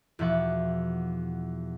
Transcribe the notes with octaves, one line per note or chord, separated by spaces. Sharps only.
E2 B2 F3 E5 F#5 D6